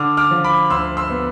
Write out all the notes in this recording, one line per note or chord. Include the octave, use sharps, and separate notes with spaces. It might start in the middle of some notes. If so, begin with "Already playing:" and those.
Already playing: D3 D6 F6
D6 F6
F3
B5 D6
D2 C6 E6
C6 E6
B3